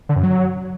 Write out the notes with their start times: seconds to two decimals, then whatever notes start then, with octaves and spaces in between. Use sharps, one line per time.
0.09 D3
0.16 F#2
0.23 F#3